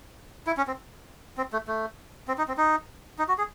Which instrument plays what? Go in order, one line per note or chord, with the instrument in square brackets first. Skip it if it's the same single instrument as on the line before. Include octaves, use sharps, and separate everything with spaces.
[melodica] E4
C#4
C4
C4
A3
A3
C4
D#4
C4
D#4
D#4
F#4
G#4